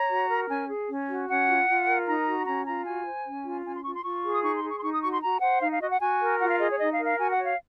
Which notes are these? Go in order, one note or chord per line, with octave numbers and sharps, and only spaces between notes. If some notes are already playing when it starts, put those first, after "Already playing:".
Already playing: C#5 A#5
F#4
A#4
C#4 G#5
G#4
C#4
F#4
C#4 F#5
F4
F4
A#4
D#4 A#5
F#4
C#4 A#5
F4 A#5
F#4 G#5
C5
C#4
F4
C#4 G#5
C6
F4 C#6
C6
F4 C#6
G#4
D#6
D#4 C#6
C6
G#4
C#6
C6
D#4 C#6
D#6
F#4 C#6
C6
F#4 A#5
C5 F#5
D#4 F5
F5
F#4 D#5
F#5
F#4 G#5
A#4
F4 F#5
F5
G#4 D#5
C#5
D#4 D#5
F5
A#4
F5
F#4 G#5
F#5
C#5
F5